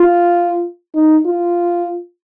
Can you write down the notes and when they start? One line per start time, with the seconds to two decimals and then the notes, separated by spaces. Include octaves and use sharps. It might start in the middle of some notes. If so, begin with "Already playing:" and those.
Already playing: F4
0.95 D#4
1.26 F4